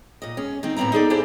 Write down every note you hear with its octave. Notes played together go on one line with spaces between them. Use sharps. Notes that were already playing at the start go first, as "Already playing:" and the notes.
A#2 D#5
C#4 G#4
D#3 C4 D#4
A2 B3 C4 E4 A#5
D#4 G#4 A4 D5
D4 E4 G4 G#4 C5 D5